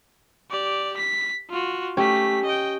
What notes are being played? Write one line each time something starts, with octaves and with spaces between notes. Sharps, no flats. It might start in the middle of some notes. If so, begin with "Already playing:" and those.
G4 D5
B6
F4 F#4
A3 C#4 G4 B6
D#5 G5